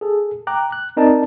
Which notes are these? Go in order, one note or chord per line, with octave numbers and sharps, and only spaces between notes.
G#4 A4
G5 A#5 D6 F#6
F#6
C4 D#4 A#4 D5 A5